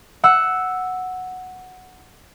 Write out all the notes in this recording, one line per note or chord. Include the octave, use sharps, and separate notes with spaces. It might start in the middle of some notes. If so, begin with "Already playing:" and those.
F#5 E6